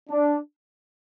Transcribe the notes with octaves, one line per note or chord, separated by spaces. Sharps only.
D4